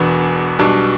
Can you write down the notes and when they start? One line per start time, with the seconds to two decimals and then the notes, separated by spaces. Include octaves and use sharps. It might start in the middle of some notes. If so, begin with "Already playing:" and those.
Already playing: E1 E2 B2 B3 D4
0.59 B1 B2 G3 D4